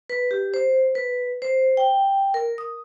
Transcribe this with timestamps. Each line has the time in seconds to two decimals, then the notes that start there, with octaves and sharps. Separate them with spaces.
0.10 B4
0.31 G4
0.54 C5
0.95 B4
1.42 C5
1.77 G5
2.34 A#4
2.58 D#6